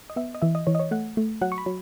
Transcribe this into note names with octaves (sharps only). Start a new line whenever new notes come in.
D#5
B3 E5
D#5
E3 E5
D#5
E3 C#5
D#5
C#5
A3 F#5
A3
F#3 F#5
C#6
B5
F#3